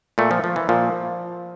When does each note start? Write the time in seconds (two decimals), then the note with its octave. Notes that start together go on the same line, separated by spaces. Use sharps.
0.18 A#2 A3
0.31 F3
0.44 F3
0.56 E3
0.69 A#2 F3